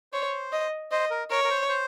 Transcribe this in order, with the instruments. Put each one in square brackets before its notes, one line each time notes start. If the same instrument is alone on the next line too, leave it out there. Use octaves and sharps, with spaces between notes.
[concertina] C5 [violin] C#5
[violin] D#5
[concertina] C5 [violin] D#5
[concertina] A#4
[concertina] A#4 [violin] C#5
[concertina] A#4
C5
C5